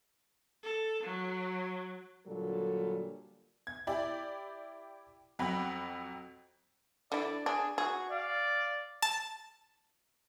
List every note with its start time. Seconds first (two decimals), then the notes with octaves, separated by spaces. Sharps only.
0.64 A4
1.04 F#3
2.26 A#2 D3 F#3 G3 A4
3.67 G#6
3.87 E4 G4 D5
5.39 F2 F#3 F#4 G5 B5
7.12 D3 E4 D5
7.46 D4 G#4
7.78 F#4 G#4
8.11 D5 F5
9.02 A5